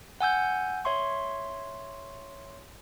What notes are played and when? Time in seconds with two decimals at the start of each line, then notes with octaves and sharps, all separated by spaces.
0.21 F#5 G#5 E6 G6
0.85 C#5 E5 C6 C#6